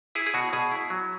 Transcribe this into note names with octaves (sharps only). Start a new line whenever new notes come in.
E4 G#4
G#4
B2 F#4
B2 G#4
E4
F#3